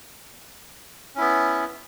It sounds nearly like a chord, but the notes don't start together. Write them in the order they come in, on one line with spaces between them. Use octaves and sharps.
C#4 E4 B3